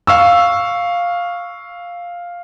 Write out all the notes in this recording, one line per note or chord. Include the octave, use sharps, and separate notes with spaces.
F5 C#6 E6